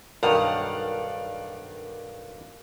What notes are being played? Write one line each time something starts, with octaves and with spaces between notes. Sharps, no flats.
B1 G2 D#3 A#4 D5 F5 F#5